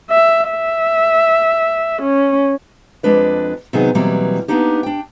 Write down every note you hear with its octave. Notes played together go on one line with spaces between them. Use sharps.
E5
E5
C#4
F2 F#3 G#3 D4 B4 D5
C3 D#3 F#3 B3 D#4 G#4
B2 E3 F#3 G3 A#3 C4
A#3 B3 D4 D#4 G4
D4 G5